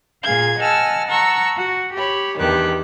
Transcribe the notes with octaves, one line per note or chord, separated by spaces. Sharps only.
A#2 G#4 F5 G#6
D#5 F#5 G#5 A5 E6 F6
F#5 A5 A#5 C#6 E6
F#4
G4 C#5 B5
E2 G2 D#3 G4 F#6